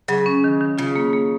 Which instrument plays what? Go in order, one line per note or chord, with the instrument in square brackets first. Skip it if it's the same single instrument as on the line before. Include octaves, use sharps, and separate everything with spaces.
[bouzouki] C#3 [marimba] F#3
[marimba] C#4
D#3
D#3
[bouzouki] C#3 [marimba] F4
[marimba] A#3
A#3